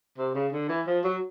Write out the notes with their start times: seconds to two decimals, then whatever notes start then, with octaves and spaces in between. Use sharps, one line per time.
0.18 C3
0.35 C#3
0.52 D3
0.69 E3
0.87 F3
1.04 F#3